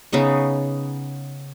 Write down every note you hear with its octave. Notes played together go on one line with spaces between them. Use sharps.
C#3 B3 D#4 C#6